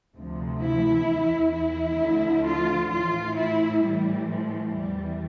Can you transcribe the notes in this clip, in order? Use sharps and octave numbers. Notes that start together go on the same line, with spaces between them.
D2 C3 F3
E4
E2 E3
E4
D2 D3 F3
F4
A2 E3 F4
E4
A2 E3 G3
F3
E2 E3 G3